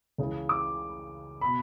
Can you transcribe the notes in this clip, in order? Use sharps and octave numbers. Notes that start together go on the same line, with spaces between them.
C#2 C#3 E3
D6
B2 B5